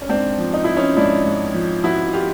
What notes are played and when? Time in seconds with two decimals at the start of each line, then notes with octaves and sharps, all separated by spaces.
0.01 C#4
0.09 G#2 C4 D4
0.38 F3
0.53 D#4
0.64 F3 E4
0.76 C#4 D#4
0.97 G#2 D4 E4
1.26 G#2
1.54 F3
1.84 F3 E4 F#4
2.13 F4 G4